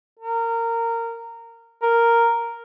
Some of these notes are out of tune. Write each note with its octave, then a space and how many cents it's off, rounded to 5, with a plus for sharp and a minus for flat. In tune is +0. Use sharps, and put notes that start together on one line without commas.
A#4 -20
A#4 -5